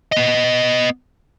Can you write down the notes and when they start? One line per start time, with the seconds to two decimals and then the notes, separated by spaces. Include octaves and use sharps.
0.12 B3 D#5